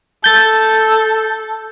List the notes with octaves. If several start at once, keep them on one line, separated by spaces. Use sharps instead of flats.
A4 G6 A6